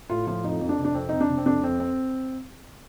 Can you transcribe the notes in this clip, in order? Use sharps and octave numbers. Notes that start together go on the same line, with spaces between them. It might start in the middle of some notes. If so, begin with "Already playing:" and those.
A2 F4
F3 F4
F2 D#4
F2
D4
C3
D4
F2 C4
F2 D#4
D4
C3
C4
F2 D4
F2 C4
C4